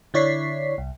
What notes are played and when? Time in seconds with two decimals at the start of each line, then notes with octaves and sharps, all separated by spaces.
0.14 D3 E4 C#5 D5 B6 C7
0.78 C2